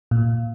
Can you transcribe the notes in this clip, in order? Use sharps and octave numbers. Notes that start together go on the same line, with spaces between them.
A#2